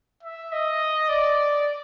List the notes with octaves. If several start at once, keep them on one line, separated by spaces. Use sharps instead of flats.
E5
D#5
D5